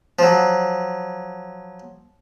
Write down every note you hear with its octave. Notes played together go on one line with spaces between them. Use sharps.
F3 F#3